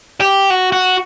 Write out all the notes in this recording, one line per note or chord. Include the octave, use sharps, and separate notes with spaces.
G4
F#4
F#4